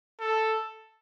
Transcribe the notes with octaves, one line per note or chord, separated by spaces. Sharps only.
A4